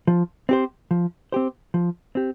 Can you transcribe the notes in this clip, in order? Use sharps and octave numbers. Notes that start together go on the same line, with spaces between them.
F3
C4 G4 C5
F3
C4 G4 C5
F3
C4 G4